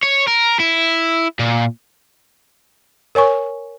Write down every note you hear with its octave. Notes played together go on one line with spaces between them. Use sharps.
C#5
A#4
E4
A#2
A#4 C#5 G#5 C#6